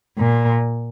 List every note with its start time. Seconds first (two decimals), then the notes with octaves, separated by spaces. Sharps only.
0.18 A#2